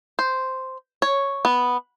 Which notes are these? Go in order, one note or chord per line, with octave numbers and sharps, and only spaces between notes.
C5
C#5
B3